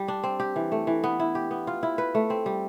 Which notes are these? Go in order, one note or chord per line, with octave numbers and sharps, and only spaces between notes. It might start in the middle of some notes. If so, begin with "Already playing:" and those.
Already playing: G3
D4
C4
G4
E3
A3
E3
B3
E4
G4
B3
F4
E4
B4
A3
C4
G3